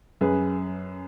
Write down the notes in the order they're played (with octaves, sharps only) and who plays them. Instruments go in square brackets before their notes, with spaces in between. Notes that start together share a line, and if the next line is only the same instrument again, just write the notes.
[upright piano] F#2 G#4 B4